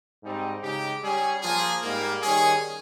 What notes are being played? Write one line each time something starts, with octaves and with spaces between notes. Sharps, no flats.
G#2 G3 C4 D#4
C#3 G#3 D#4 G4
G3 C#4 G#4
F3 A#3 F4 G#4
G#2 G3 A#3
D#3 G3 C#4 G#4